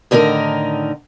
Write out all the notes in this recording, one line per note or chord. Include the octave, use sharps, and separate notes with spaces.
A2 D3 D#3 D#4 A#4